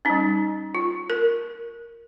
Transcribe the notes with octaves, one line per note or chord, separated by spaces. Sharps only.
G3 C#4 D#4
F4
A#4